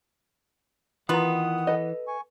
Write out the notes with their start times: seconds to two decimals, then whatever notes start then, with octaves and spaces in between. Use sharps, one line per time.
1.09 D#3 E3 B3 F4 F#5 A#5 D#6
1.67 A4 B4 D#5
2.08 G#5 C#6